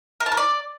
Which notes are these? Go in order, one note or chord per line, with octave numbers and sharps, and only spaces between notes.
A#4
A5
A#4
D5